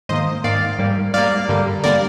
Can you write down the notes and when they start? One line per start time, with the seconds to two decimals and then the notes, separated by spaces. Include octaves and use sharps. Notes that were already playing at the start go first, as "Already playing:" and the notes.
0.09 G#2 D#3 A#3 C5 D#5
0.44 G#2 D#3 A#3 D5 F5
0.79 G#2 G3 A#3
1.14 G#2 G3 A#3 D5 F5
1.49 G2 D3 G3 A#3
1.84 D3 G3 A#3 A#4 D5